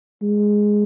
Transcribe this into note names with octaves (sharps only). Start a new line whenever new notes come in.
G#3